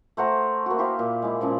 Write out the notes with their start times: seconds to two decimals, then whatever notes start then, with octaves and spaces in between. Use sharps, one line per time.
0.17 A3 C5 F#5 A#5
0.66 A#3 F#4
0.79 E4 G4 C5 F5
0.99 A#2
1.22 G#3 E4
1.40 A#2 C#3 F3 G#3